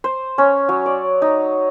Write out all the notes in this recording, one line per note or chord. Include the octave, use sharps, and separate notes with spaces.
C5
C#4
F#3
D5
D#4